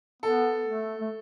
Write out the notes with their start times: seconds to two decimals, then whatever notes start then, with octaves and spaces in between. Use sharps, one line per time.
0.23 B3 A4
0.66 A3
1.01 A3